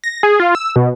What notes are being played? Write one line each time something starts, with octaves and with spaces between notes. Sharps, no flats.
A#6
G#4
F4
E6
B2